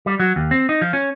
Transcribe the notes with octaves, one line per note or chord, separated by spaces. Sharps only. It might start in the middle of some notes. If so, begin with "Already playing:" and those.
G3
F#3
D#2
C4
D#4
F3
C#4